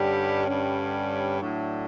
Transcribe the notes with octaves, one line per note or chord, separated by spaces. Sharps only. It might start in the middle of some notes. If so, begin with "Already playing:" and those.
Already playing: G2 D3 G3 C#4 G4
G2 D3 G3 C#4
A2 F#3 A3 D4